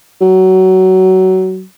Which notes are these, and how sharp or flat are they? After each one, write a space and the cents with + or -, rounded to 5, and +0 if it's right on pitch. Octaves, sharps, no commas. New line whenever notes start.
F#3 +20